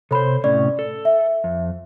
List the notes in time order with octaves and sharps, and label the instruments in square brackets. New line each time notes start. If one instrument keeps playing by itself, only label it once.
[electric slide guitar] C3 C5 [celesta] A4 C#5 B5
[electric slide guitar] A2 C3 C#4 [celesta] D5
[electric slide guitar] A4
[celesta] E5
[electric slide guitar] F2